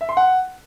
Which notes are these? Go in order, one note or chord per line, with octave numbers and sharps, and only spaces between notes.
E5
C6
F#5